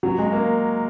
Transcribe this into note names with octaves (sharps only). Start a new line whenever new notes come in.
F#3
G#3
A#3